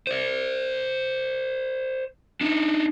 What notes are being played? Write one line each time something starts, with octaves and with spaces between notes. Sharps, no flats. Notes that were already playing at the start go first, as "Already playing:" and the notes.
C5 D5
D4 D#4